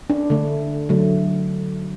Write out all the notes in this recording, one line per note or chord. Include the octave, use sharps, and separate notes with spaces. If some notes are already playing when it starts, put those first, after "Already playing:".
D4
D3 A3
D3 F#3 A3